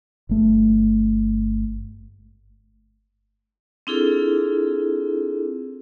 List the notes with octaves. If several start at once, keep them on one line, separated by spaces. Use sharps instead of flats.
G1 A3
C4 D4 E4 F4 G#4 A4